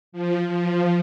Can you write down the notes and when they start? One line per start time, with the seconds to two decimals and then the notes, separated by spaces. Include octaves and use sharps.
0.12 F3
0.48 F3